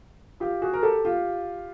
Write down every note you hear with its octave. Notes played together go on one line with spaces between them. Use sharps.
F4 G4
F#4 G#4
A#4
G4 A4
F4 G4